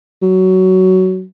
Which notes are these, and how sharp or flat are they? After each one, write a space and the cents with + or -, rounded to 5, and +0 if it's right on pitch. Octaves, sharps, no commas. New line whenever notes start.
F#3 +15